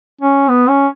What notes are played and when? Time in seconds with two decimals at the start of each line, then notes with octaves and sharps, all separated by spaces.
0.21 C#4
0.48 B3
0.69 C#4